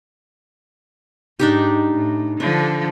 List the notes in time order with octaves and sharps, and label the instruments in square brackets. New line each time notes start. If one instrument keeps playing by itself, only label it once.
[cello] G#2 [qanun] D4 D#4 G4
[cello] A2
[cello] D3 F3 [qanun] D4